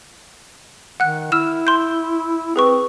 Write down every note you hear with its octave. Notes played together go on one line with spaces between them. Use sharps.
D#3 F#5 F#6
E4 E6 F6 E7
C6 G6
C4 G#4 B4 C#6